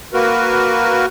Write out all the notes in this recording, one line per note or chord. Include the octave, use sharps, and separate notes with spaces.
A#3 F#4 A#4 B4